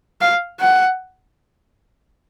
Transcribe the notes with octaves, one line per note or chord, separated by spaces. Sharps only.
F5
F#5